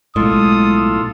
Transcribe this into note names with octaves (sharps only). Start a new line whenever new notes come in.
B1 A2 G#3 F4 A4 D#6